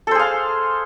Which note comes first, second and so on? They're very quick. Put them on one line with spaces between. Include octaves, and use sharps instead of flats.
A4 C5 G#4 F5